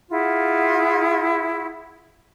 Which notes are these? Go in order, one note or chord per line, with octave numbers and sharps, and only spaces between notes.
E4 F4 G#4 F#5